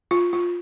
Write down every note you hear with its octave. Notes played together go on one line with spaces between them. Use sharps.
F4
F4